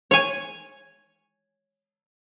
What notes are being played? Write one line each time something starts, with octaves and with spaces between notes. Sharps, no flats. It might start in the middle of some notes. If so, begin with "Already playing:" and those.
C#5 G#5